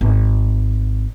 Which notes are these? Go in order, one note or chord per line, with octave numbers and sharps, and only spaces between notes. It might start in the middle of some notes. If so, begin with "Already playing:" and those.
G#1